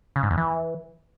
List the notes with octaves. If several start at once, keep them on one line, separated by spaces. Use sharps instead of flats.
C#3
G#2
E2
E3